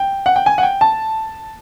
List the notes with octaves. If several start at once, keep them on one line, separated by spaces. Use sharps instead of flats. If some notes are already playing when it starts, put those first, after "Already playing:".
Already playing: G5
F#5
G5
G#5
F#5
G5
A5